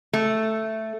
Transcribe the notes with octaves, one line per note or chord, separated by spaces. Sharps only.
A3